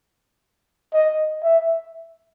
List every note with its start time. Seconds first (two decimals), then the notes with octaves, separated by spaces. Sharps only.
0.94 D#5
1.43 E5